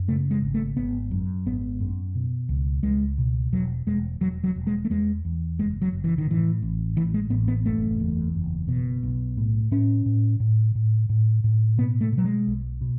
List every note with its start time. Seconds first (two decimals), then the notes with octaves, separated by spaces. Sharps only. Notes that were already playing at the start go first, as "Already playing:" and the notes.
Already playing: F#2
0.08 C#3 A3
0.31 G#3
0.42 G#1
0.54 A3
0.77 G#1 B3
1.11 F#2
1.46 G#1 B3
1.80 F#2
2.15 B2
2.49 C#2
2.83 C#2 G#3
3.18 B2
3.52 E1 F#3
3.86 E1 G#3
4.21 E1 F#3
4.44 F#3
4.56 E1
4.67 G#3
4.85 A3
4.90 E2 G#3
5.25 E2
5.59 F#1 G#3
5.82 F#3
5.93 F#1
6.04 E3
6.18 D#3
6.27 A2 E3
6.62 A1
6.96 A2 E3
7.14 G#3
7.30 A1 B3
7.48 B3
7.65 F#1 A3
8.00 E2
8.34 F#1
8.68 B2
9.03 B1
9.37 A2
9.71 A2 C#4
10.06 A2
10.40 A2
10.75 A2
11.09 A2
11.44 A2
11.77 B2 B3
12.01 A3
12.12 B2
12.18 F#3
12.24 G#3
12.47 B1
12.81 B2